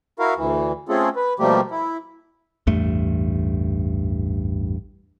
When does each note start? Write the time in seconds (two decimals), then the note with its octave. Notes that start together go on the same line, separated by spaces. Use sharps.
0.19 E4 F#4 A#4 F5
0.36 D2 E3
0.89 A3 C4 C#4 F4 G#4 A4
1.16 B4
1.39 B2 F3 G3 A3 A#3 G4
1.71 E4
2.67 A1 E2 G2 A3